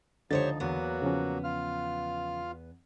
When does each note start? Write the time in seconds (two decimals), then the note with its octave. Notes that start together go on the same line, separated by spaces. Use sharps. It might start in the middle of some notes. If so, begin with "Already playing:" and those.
0.31 C#2 D3 F3 D#4 G4 C5 C#5 A6
0.60 E2 F#3 A#3 B3 F#4
1.02 C#3 F3 C#4
1.44 F4 F5 F6